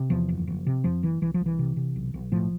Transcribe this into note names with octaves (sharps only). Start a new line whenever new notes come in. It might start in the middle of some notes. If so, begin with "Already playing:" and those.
Already playing: C3
E2 F3
F#1
F#1
C3
F2 F3
F#1 E3
C2 E3
F3
C2
E3
C3
C3
B1
B1
A2 F3